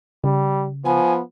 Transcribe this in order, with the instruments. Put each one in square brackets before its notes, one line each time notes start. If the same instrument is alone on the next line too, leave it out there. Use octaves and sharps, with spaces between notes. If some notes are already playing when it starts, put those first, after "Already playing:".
[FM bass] C#3 [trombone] G3
[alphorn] F3 [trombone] B3 [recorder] G#5